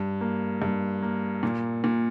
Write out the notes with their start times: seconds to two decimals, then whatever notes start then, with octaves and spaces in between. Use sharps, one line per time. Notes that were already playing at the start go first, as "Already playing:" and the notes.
Already playing: G2
0.21 A#3
0.62 G2
1.02 A#3
1.43 A#2
1.84 A#2